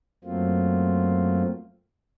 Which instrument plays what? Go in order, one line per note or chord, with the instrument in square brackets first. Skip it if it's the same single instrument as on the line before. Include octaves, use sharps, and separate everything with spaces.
[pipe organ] F#2 F#3 A3 A#3 C4 F4